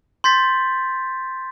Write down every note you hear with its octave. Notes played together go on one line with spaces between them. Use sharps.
C6 G6 A6 B6